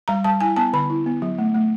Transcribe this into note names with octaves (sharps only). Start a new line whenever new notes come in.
G3 A#5
G3 A5
E4 G#5
B3 A5
D3 B5
E4
B3
F#3
A3
A3